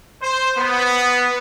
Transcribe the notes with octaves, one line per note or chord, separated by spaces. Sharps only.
C5
B3